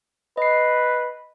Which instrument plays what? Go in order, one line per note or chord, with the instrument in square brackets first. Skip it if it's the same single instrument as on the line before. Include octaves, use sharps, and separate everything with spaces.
[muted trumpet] B4 [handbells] D#5 C7